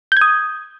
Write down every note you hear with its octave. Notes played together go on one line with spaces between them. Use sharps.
D#6 G6 G#6